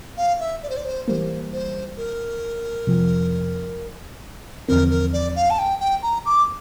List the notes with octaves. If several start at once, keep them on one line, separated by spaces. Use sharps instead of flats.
F5
E5
D5
C5
D5
C5
E3 G3 A#3 C5
C5
A#4
F2 C3 F3
E2 D3 F3 C4 A#4
A#4
D5
F5
A5
G5
G5
A#5
D6